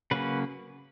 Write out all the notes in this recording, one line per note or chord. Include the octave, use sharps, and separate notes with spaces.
C#3 F#3 A#3 C#4 B4